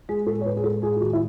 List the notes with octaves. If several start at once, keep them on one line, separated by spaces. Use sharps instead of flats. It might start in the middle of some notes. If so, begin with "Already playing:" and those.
G#3 G#4
A2 A4
C#5
A2 B4
G#4
G#3 A4
A2 G#4
G#4
D#3 F#4
E4